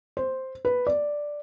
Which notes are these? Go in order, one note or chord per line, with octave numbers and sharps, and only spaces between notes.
C5
B4
D5